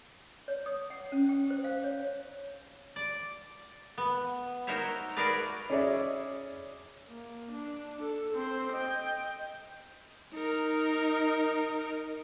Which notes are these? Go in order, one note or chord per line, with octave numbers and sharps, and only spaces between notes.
C#5
D#6
F#5
C#4
G5
C5
F5
C#5
D5
B3
D#4 F#4 A#4 C5 C#5 E5
F#4 G#4 A#4 B4 D5
C#4 G#4 D5 E5
A#3
D4
A4
C4 C5
D#5 G5
D#4 A#4